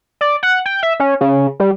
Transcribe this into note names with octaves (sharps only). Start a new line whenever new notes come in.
D5
F#5
G5
E5
C#4
C#3
G3